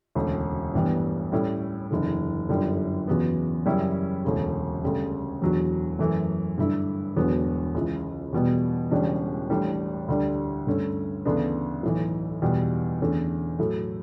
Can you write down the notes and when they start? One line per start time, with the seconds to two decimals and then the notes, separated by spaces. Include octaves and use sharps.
0.15 E1 D2 C#3
0.74 A1 G2 E3 G3 B3
1.32 A2 G3 C#4 E4
1.91 F#1 E2 D3
2.49 G1 F#2 D3 G3
3.08 E2 C#3 F#3 B3
3.66 F#2 C#3 G3 C#4 E4
4.24 E1 D2 C#3
4.83 D2 C#3 G3
5.41 E1 E2 D3 F#3
5.99 F#2 E3 A3
6.58 G2 D3 A3 E4
7.16 E1 E2 D3 F#3 B3
7.75 C#2 C#3 E3
8.33 E2 B2 G3 B3
8.91 E1 E2 C#3 G3 D4
9.50 A1 A2 G3 D4
10.08 D2 D3 G3 D4
10.67 G2 D3 A3 C#4
11.25 D2 C#3 E3 B3 D4
11.83 B1 A2 E3
12.42 E2 B2 G3 B3
13.00 E2 D3 A3 C#4
13.58 A2 F#3 A3 E4